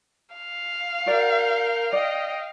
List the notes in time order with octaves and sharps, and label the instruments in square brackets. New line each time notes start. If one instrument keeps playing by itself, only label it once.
[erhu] F5
[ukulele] F#4 D5 F#5 [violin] A#4 G6
[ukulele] D5 [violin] D#5 G5